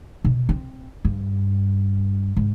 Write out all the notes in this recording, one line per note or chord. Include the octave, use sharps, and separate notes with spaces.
B2
C4
G2
G#2